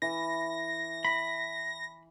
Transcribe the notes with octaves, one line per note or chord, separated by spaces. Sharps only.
E3 A#6
B5